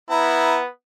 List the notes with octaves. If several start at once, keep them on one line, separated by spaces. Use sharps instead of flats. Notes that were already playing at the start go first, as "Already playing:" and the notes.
B3 E4 A#5